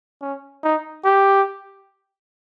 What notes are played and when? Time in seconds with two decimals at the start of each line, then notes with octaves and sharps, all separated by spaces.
0.22 C#4
0.63 D#4
1.05 G4